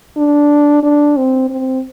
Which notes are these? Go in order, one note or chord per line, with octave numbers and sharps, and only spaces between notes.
D4
D4
C4
C4